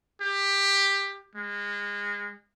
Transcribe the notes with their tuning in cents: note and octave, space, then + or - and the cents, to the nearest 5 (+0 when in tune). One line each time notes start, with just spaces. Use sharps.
G4 +15
G#3 -30